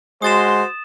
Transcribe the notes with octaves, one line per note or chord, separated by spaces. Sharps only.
G#3 F#4 C5 C6 D#6 A6 E7